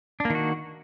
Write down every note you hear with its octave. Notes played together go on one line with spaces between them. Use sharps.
D#3 A#3 D4 F#4